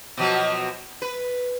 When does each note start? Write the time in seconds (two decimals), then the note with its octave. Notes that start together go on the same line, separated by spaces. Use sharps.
0.17 B2 F3 F#3
1.02 B4